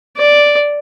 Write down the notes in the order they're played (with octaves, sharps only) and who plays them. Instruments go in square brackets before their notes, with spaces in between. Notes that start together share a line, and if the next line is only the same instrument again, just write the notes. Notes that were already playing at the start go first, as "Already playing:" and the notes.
[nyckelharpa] D5